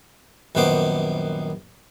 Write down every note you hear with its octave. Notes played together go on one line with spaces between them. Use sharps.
A#1 F#2 D#3 B3 C5 D6